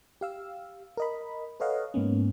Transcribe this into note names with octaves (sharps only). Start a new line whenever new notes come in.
G4 F5 E6
A#4 D#5 B5
A4 B4 C#5 D#5 F5 F#5
G#2 A#3 B3 C#4